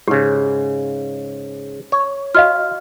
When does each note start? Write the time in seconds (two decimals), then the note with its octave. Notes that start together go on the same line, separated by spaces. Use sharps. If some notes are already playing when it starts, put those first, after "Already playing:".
0.08 G#2 C#3 G4
1.92 C#5
2.35 F#4 D#5 F5 F6